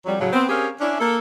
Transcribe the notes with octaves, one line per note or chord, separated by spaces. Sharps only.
F2 F#3 G3
A2 C#3 F#3
B3 C4
C4 C#4 G4 G#4 A#4 F5
C#4 D4 E4
A#3 A4